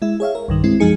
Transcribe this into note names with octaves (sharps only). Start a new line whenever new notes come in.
G#3 E4 E5
G#4 C#5 E5 F5
A#4
B1 G2 D#3
G#3 C4 E4
F#2 F3 G#3 D#4 G#4 C#7